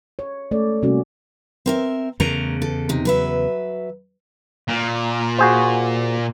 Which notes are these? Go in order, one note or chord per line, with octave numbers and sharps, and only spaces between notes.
C#5
G#3 A3 C#4 A4 C#5 D5
C3 G3 A#3 C#4 F#4
C4 A#4 E5
E2 C#3 A3 A#4 A#5
A4
C3 D#4
F#3 B4 E5
A#2
F#4 G#4 C5